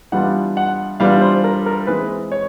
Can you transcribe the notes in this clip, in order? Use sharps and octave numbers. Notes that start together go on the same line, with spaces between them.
E3 G3 B3 D4 F4 F#5
F#5
E3 G3 B3 D4 F4 F5
C5
A#4
A#4
E3 G#3 C4 B4
C#5